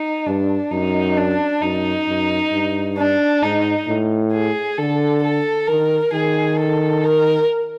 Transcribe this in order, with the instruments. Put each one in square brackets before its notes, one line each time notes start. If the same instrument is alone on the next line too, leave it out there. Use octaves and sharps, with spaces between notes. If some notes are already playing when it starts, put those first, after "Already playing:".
Already playing: [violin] D#4
[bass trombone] G2 [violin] D4
[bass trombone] F#2 [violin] D#4
[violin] D4
[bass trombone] F#2 [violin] D#4
[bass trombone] F#2
G2
[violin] D4
[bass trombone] G#2 [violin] D#4
[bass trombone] A2
[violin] G#4
[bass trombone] D3 [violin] A4
[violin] A4
[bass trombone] D#3 [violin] A#4
[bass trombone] D#3 [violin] G#4
[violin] A4
A#4